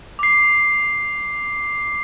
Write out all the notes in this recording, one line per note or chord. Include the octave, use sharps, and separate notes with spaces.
D6 C7